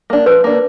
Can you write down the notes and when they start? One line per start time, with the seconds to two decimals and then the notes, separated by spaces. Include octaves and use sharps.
0.10 A#3 D4
0.26 F3 B4
0.44 A#3 D4